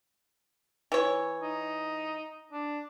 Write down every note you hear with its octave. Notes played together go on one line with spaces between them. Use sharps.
E3 C#5
D#4
D4